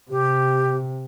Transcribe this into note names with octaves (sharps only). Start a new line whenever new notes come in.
C3 G4